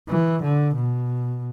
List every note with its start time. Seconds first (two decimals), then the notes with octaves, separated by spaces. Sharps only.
0.09 E3
0.42 D3
0.75 B2